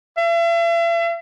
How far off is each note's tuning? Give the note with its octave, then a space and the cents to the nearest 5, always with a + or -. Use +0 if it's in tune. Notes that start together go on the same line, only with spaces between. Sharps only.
E5 +45